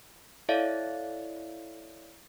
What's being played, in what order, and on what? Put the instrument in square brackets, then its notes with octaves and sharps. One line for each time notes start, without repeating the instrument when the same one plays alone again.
[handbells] E4 A4 C#5 D5 E5 F5